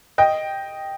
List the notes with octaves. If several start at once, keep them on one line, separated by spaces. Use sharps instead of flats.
D#5 G5